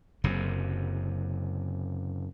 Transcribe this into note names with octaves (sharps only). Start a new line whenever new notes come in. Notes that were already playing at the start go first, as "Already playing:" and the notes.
F#1 F#2 C3